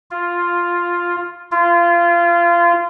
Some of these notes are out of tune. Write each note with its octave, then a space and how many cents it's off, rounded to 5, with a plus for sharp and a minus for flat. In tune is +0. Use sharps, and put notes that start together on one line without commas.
F4 +0
F4 -25